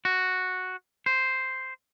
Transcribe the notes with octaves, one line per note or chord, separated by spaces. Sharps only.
F#4
C5